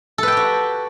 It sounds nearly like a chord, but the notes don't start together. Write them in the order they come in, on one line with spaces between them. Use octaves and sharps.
A4 B4 G5 G4 F#4